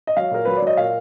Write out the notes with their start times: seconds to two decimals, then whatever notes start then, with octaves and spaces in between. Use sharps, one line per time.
0.07 D#5
0.17 F#3 F5
0.31 A#2 A#4
0.45 F#3 B4
0.56 D5
0.62 F#3 D#5
0.77 A#2 F5